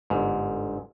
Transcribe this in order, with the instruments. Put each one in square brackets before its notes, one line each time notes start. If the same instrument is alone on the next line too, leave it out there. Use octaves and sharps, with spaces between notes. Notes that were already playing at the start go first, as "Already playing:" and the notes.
[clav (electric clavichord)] G1 G#2